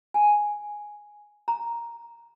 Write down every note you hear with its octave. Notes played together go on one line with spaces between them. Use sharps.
G#5
A#5